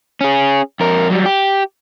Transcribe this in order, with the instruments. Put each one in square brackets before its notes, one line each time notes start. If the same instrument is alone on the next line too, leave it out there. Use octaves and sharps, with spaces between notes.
[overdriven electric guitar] C#4 G#4
F2 A#4
F#3 G3
G4